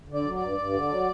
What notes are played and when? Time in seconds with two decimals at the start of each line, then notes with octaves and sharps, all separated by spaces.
0.08 D3
0.14 D5
0.25 F#3
0.35 D5
0.41 G2
0.58 G2
0.73 D3
0.90 F#3